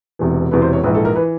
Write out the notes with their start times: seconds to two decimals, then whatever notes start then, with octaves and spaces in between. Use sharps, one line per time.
0.19 E1 E2 C3 E3
0.51 E1 E2 C3 E3 B4
0.62 C5
0.73 C#5
0.84 A#1 G#2 E3 B4
0.95 A4
1.05 A#4
1.16 E3 B4